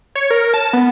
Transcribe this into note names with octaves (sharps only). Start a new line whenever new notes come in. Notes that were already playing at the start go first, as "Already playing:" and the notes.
C#5
A#4
A5
B3